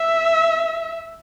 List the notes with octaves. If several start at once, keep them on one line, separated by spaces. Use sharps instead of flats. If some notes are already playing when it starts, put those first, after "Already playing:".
Already playing: E5